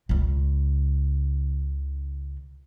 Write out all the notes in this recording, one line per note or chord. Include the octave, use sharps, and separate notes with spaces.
C#2 C#3